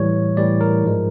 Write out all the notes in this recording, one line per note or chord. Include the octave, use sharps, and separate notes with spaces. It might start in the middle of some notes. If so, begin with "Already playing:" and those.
Already playing: A2 E3 G3 C#5
A2 E3 G3 D5
A#4
G#2 F3 G#3